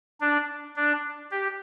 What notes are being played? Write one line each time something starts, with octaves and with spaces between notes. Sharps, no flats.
D4
D4
G4